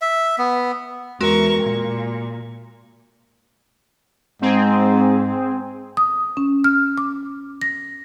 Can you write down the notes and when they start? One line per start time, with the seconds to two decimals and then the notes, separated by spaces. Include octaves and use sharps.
0.02 E5
0.39 B3
1.21 E2 G#3 F#4 A#4 C#6
1.62 A#2
4.42 G#2 C4 G#4
5.97 D#6
6.37 C#4
6.64 F6
6.98 D6
7.62 A#6